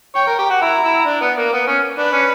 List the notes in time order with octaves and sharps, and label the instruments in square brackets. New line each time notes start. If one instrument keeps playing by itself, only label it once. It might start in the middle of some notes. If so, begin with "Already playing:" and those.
[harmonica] C#5 [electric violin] G5
[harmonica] A#4
G4
F#4
[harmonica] E4 [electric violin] A#5
[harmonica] E4
D4
B3
A#3
B3
C#4
[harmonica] D4 [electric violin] B4
[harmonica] C#4